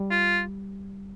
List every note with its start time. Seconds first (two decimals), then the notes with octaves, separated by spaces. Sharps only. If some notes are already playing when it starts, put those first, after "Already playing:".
Already playing: G3
0.10 F4